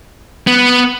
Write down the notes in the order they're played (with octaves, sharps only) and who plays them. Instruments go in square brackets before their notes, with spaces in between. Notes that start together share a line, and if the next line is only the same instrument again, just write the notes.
[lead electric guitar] B3